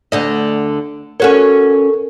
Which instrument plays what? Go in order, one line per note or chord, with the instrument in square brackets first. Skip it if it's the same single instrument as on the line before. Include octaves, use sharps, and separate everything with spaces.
[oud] D2 D3 D#5
[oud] C#4 F#4 C#5 [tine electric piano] A4 A#4